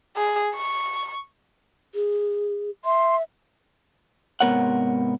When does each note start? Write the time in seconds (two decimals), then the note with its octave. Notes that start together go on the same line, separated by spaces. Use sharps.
0.16 G#4
0.55 C#6
1.95 G#4
2.85 E5 C6
4.40 G#2 C3 B3 A#4 C#5 F#5